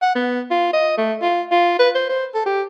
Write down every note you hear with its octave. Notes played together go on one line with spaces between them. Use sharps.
F#5
B3
F4
D#5
A3
F4
F4
B4
C5
C5
A4
G4